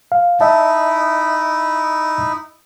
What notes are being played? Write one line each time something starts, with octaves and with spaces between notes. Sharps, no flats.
F5
D#4 E4 D#5 E5 A5